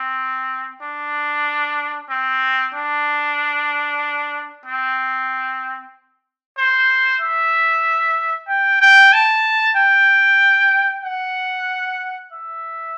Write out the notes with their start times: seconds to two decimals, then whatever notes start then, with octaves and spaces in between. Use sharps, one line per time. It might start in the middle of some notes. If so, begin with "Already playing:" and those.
Already playing: C4
0.82 D4
2.10 C4
2.75 D4
4.66 C4
6.58 C5
7.21 E5
8.48 G5
8.81 G5
9.13 A5
9.76 G5
11.04 F#5
12.33 E5